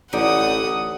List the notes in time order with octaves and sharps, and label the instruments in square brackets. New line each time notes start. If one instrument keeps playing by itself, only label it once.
[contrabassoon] A1 [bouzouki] D3 D#4 D5 [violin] F#5 D#6